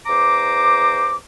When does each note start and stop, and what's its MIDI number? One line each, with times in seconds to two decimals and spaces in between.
0.07 1.17 40
0.07 1.17 72
0.07 1.17 82
0.07 1.17 86